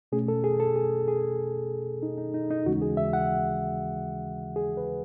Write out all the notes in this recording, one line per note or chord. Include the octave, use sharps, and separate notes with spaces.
B2 A3 C#4 G#4
A4
G#4
A4
G#4
G#4
D#4
D#4
D#4
D#4
D#2 C#3 E3 G#3 C#4 F#4
G#4
E5
F#5
G#4
B4